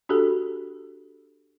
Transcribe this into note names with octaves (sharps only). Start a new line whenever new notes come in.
D4 F#4 G4 A4